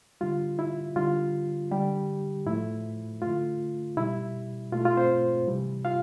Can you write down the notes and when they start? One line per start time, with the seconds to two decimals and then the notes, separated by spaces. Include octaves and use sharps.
0.21 D3 G3 F4
0.59 E4
0.96 D3 G3 F4
1.71 D3 G3 G4
2.46 A2 F3 A3 E4
3.22 D3 A3 F4
3.97 B2 G3 E4
4.72 B2 A3 F4
4.85 F4
4.97 C4 C5
5.47 C3 E3 G3
5.85 F4 F5